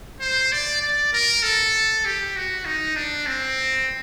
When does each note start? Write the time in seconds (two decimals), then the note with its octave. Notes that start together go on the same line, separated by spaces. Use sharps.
0.21 C5
0.52 D5
0.82 D5
1.13 A#4
1.43 A4
2.05 G4
2.36 F#4
2.65 D#4
2.96 D4
3.27 C4